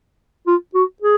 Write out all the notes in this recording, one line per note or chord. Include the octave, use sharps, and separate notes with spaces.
F4
F#4
G#4